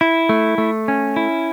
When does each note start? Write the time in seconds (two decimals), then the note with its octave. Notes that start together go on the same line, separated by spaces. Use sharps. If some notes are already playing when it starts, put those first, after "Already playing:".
0.01 E4
0.29 A3
0.58 A3
0.88 C#4
1.16 E4